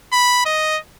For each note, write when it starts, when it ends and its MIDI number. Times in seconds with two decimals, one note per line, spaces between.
0.13 0.42 83
0.46 0.78 75